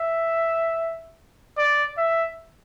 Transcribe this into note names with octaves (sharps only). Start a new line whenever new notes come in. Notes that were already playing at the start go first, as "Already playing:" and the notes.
Already playing: E5
D5
E5